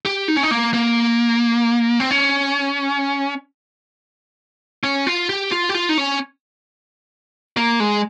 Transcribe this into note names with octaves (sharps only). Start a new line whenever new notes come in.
G4
D#4
C#4
D#4
A#3
A#3
C4
C#4
C#4
F4
G4
F4
G4
F4
D#4
C#4
A#3
G#3